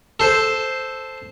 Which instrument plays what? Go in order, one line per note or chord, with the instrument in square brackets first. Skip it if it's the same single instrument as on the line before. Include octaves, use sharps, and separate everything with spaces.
[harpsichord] A4 C5